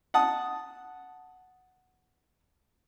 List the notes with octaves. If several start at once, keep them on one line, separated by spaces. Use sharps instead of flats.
F#5 A5 D#6